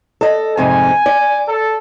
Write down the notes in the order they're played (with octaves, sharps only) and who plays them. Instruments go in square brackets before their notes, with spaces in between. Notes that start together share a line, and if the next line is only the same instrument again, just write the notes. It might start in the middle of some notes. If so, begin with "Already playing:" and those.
[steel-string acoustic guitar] A4 D#5
[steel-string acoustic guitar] F2 G#2 C3 [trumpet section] G#5
[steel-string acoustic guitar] D5
[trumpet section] A4